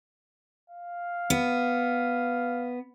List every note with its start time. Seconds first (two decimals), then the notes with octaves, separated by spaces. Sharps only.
0.70 F5
1.30 B3